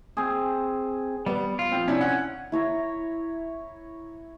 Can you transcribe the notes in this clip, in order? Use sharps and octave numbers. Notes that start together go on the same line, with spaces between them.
C4 G#4
G3 B3
F4
F3 C4
C3 C#4 D4 E4
F#5
E4 C#5 A#5